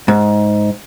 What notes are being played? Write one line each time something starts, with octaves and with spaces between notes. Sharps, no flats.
G#2